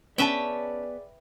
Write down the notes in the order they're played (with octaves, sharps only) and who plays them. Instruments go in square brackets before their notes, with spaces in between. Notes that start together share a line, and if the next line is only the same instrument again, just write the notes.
[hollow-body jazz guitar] B3 [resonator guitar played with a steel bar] C#4 A5 [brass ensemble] G#4 D5 [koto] B4 E5 G5